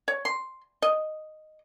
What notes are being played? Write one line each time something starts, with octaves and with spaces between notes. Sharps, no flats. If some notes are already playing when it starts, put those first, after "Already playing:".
C#5
C6
D#5